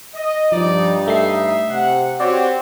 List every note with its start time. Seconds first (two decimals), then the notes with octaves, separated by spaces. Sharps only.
0.15 D#5
0.52 G2 F3 D#4 D5
1.08 A3 E5 C7
1.69 C3 F#5
2.20 C4 F#4 G4 C#5 D5